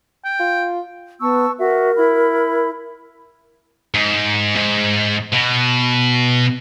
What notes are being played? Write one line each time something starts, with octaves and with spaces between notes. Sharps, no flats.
G5
F4
B3 A5 C#6 E6
F#4 A#4 E5
E4 B5
G#2
G#2
B2